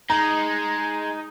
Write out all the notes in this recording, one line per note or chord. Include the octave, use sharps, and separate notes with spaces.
G#3 D#4 A#5